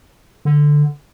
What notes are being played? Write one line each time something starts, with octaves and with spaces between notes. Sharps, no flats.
D3